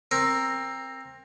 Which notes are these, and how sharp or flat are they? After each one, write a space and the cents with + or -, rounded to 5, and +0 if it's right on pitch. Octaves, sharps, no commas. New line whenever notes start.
C4 +20 A#4 +0